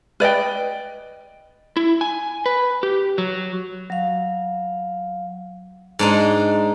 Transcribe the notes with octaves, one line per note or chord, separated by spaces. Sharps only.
B4 D5 D#5 G5
E4
G#5
B4
G4
F#3
F#3 F5
G#2 D4 D#4